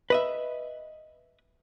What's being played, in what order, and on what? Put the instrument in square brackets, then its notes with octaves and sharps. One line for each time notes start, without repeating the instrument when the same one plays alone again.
[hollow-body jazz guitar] B4 D#5 E5